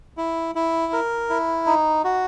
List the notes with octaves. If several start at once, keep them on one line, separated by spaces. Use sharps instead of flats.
E4
E4
A#4
E4
D#4
F#4